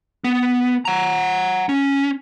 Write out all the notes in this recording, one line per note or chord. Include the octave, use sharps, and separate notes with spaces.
B3
F#5 A#5
C#4